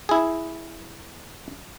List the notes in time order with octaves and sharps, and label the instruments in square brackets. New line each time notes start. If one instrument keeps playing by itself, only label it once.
[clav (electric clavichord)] E4 G#4